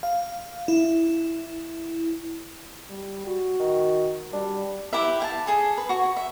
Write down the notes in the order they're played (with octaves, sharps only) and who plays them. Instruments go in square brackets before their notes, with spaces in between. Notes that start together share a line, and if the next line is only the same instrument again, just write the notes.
[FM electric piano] F5
E4
[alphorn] G3
F#4
[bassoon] D#3
[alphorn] G3 [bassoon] D4
[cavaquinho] E4 G4 B4 E5
F5 G5 A5
G#4 A4 G#5
B4
F#4 C#6
E5